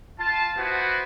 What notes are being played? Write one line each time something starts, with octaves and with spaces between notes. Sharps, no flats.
F4 A5
B3 E4 F#4 B4 C5